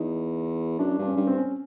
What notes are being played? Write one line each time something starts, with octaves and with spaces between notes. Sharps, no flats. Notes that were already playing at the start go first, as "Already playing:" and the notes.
Already playing: E2 D#4
F#2 D4
G2 D4
C#4
G2
C4
C#4